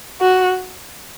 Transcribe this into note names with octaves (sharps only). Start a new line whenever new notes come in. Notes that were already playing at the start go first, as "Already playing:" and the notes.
F#4